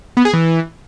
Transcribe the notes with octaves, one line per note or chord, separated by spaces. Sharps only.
B3
G#4
E3